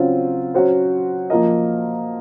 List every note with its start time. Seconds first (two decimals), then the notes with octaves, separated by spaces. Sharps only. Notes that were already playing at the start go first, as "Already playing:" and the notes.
Already playing: C#3 F#3 C4 F4
0.54 F#3 C#4 F#4 C5
1.30 F3 A#3 F4 A#4 D#5